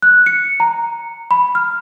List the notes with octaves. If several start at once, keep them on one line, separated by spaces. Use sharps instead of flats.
F#6
C#7
A#5
B5
F6